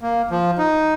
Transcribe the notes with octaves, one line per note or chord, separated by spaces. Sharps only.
A#3
F3
D#4